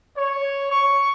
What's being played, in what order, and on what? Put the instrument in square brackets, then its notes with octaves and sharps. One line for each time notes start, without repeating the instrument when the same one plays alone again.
[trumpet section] C#5
C#6